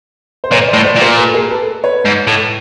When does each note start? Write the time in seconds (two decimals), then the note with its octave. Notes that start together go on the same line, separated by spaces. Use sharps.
0.44 C5
0.52 A#2 B4 C#5
0.68 C5 D5
0.74 A2
0.85 C5 D5
0.96 A#2
1.01 A#4 C5
1.17 A4 B4
1.34 G#4 A#4
1.51 A4 B4
1.84 B4 C#5
2.06 G#2
2.28 A2